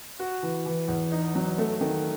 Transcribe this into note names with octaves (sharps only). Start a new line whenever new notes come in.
F#4
E3
E3
E2
D#4
F#3
A3
D#3